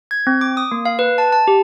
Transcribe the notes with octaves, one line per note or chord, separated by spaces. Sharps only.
G#6
C4
D6
D#6
A#3
F5
B4
A5
A5
G4